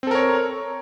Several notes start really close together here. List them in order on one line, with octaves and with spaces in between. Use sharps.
C4 A4 A#4 C#5